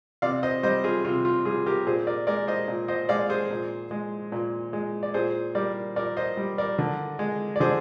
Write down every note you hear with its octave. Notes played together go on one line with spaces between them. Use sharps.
C3 D5 F5
C5 D#5
G3 C5 D#5
F4 G#4
C3 F4
F4
G3 F4 G#4
G4 A#4
A#2 G#4 C5
A#4 D5
G#3 A#4 D5
C5 D#5
A#2
C5 D#5
G#3 D5 F5
G#4 C5
A#2
G#3
A#2
G#3
D5
A#2 G#4 C5
G3 A#4 D5
A#2 A#4 D5
C5 D#5
G3
A#4 D5
D3
G#3
D5
D3 G#4 C5